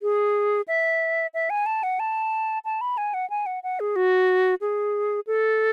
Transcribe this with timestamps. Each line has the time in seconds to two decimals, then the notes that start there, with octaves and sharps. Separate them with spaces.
0.02 G#4
0.68 E5
1.34 E5
1.50 G#5
1.66 A5
1.83 F#5
2.00 A5
2.65 A5
2.81 B5
2.97 G#5
3.14 F#5
3.30 G#5
3.46 F#5
3.63 F#5
3.80 G#4
3.96 F#4
4.61 G#4
5.27 A4